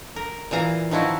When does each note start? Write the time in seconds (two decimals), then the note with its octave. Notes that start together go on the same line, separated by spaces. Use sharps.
0.16 A#4
0.51 A#2 E3 F5 A#5
0.91 D#3 F3 E4 F#4